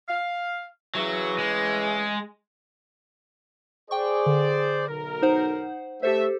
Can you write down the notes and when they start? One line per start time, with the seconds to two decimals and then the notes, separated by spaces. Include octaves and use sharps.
0.08 F5
0.95 C#3 E3 F#3
1.38 G#3
3.91 G#4 C5 D5 G5 C#6
4.26 D3
4.88 B1 A#4
5.22 D#4 C5 F#5
6.03 A3 G4 A4 C5 E5